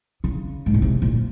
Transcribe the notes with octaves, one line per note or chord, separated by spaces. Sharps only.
C#3
G#2
A#2
C3
A#2